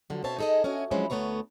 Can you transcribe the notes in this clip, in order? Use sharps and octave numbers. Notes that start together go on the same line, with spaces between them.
D3 F3 F#3
B2 C4 C#5 E5 A5
D#4 G#4 A4 C5 D#5
C#4 F#4 D#5 E5 G#5
F3 F#3 G#3 C4 C#4 E4
D2 A3 B3 C4 C#5 A#5